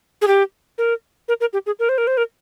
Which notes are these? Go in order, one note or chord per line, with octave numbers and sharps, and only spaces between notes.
G#4
G4
A#4
A#4
A#4
G4
G#4
A#4
C5
A#4
C5
A#4